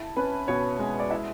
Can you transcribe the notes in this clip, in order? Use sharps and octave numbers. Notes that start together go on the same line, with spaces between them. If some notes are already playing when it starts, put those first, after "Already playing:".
Already playing: E4 A5
C#4 B4
B2 C#5
G#3
D5
E4 E5